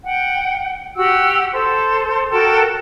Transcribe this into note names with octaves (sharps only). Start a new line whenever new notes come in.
F#5 G5
F#4 G4 F#5 E6
A4 C5
F#4 A4 A#4 G5